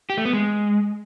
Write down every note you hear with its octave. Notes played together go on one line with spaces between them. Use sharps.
G4
A3
B3
G#3